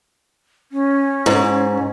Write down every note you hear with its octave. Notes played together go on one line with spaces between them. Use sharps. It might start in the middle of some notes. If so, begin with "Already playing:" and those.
C#4
G#2